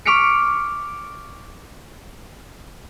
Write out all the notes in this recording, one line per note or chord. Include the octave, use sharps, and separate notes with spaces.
C#6 D6 F6 B6 C#7 D7